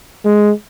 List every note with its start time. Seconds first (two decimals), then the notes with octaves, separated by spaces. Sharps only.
0.25 G#3